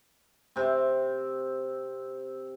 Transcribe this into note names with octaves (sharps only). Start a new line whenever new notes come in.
C3 C4